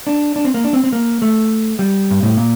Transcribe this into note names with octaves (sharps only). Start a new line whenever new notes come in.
D4
D4
C4
A#3
D4
C4
C4
A#3
A3
G3
G2
A2
A#2